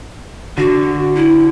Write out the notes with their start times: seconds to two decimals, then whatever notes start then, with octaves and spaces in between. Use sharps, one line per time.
0.58 D3 F#4
1.15 E4